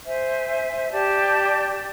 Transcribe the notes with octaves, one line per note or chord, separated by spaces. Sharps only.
C5 E5 G#5
G4 D5 A5